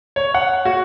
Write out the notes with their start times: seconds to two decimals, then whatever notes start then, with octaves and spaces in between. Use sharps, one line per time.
0.16 C#5
0.34 F#5
0.65 F#4